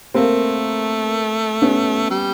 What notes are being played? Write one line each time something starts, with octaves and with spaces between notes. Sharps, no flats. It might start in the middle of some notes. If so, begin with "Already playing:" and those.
A3 A#3 C4
B3 C#4
G3